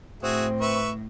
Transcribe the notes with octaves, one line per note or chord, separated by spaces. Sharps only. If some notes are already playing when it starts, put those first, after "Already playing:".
A2 C4 F#4 G#4 E5
B4 E5 C#6